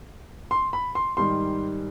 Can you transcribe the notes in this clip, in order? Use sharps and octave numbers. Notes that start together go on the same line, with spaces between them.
C6
B5
C6
G#2 D#3 G3 C6